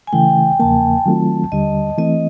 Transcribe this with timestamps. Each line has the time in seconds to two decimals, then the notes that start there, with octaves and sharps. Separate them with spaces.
0.07 G#5
0.13 C#3 E3 A3 G5
0.60 E2 C#3 F3 A#3 A5
1.06 D#3 F#3 A3 C4 F4
1.52 D#2 D3 G3 D#5
1.98 E3 A3 C4 D#5